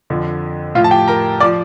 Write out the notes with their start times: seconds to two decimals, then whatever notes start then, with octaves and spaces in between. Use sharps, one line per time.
0.10 F2 D3 F3
0.75 A2 F3 F4 F5
0.84 A5
0.91 G4 G5
1.08 A#4 A#5
1.40 F3 D5 D6